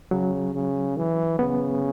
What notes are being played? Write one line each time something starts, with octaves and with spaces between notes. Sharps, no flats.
C#3 F#3
C#3
E3
C#3 B3